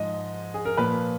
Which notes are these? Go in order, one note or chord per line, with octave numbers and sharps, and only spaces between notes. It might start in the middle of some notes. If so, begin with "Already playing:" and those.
Already playing: G#2 F3 D#5
G#4
A#4
A#2 F3 B4